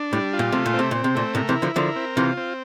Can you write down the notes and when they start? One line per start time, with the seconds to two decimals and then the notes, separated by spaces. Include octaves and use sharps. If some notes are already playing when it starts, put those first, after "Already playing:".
Already playing: D4
0.13 A2 G3
0.33 F4
0.39 A#2
0.52 C3 A3
0.66 A#2
0.74 C4
0.79 C3
0.91 A#2 C4
1.04 C3
1.15 A#2 A3
1.35 A2 C3 A#4
1.49 C3 E3
1.55 E4
1.62 D3 F3
1.76 D3 F3 A#4
1.96 C4
2.16 C3 E3 F4
2.37 C4